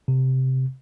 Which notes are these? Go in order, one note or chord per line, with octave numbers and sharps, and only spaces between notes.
C3